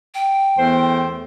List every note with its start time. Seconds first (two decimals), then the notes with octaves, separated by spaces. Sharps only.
0.14 G5
0.59 E2 A3 C5